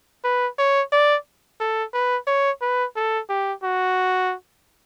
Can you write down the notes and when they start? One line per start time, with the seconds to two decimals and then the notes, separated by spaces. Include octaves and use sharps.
0.24 B4
0.58 C#5
0.92 D5
1.60 A4
1.93 B4
2.27 C#5
2.61 B4
2.96 A4
3.29 G4
3.63 F#4